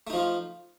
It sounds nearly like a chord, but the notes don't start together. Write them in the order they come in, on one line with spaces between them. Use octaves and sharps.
A3 D#4 F3 F4